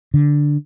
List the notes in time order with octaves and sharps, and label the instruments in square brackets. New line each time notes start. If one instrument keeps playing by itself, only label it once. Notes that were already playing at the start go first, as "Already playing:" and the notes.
[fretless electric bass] D3